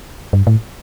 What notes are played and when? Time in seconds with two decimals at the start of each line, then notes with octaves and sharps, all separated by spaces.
0.33 G2
0.47 A2